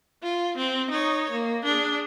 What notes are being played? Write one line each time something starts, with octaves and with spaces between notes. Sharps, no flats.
F4
C4
D#4 C#5
A#3
D4 G#4